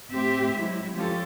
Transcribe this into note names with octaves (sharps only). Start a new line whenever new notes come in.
A2 C4 G4 E5
F#3 G#3 E4
F3 G#3 C#4 F4 G4 A4